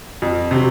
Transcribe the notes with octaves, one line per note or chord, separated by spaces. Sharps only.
F2
C3 F#3